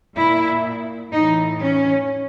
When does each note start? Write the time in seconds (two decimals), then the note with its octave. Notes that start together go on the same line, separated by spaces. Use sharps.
0.17 A#2 E4
1.12 A2 E3 D#4
1.60 C#4